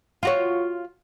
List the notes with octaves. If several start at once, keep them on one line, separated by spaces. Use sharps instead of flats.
F4 F#4 C#5